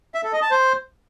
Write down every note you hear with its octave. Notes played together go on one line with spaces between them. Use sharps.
E5
A4
D#5
A5
C5